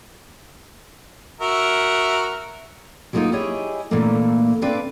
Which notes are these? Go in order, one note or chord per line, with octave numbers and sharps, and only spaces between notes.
F#4 A#4 E5
F#3 G#3 A#3 C4 D#4 F4
E4 G4 G#4 C#5 D#5
A#2 D3 E3 A3 A#3 C4
C4 D4 B4 D5 E5 F5